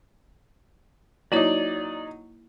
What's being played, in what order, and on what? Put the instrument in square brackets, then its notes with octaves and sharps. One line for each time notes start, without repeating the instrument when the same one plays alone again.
[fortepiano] F#3 D#4 [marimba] A#3 E4 C#5 [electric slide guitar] D5